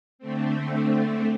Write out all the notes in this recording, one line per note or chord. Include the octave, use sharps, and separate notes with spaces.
D3 A3 C4